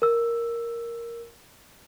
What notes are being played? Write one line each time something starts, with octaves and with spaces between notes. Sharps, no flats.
A#4 E6